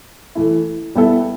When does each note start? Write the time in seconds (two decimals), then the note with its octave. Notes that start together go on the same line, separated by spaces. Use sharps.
0.35 E3 A3 E4
0.95 G3 B3 E4 A4 E5